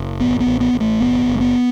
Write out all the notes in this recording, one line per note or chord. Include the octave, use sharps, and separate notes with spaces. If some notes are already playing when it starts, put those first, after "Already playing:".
Already playing: F#1
A1 B3
B3
A1
B3
A1
A3
F#1 B3
F#1
A3
B3